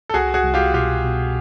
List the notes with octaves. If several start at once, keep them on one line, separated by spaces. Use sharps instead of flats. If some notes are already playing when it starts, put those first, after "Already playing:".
A4
C2 F#4 G#4
F#4 G#4
C2
F4 G4
B2 F4 G4
B2